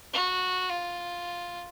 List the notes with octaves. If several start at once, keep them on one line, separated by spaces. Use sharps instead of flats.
F#4
F4